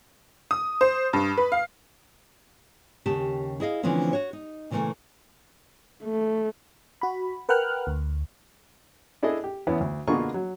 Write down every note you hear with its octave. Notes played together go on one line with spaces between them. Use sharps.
D#6
C5
G2
B4
F5
D#2 C#3 G4 A5
E4 G#4 D#5 F5
D3 E3 F3 A3 C4 C#4
F#4 C#5
D#4
A#2 C#3 E3 F3 A3 A#3
A3
F#4 B5
A#4 B4 F#5 G5 F6 F#6
D2
D4 E4 G#4 A4 D#5
G4
E2 B3 C#4 E4
D2
B2 D3 A#3 F4 G#4 C#6
F#3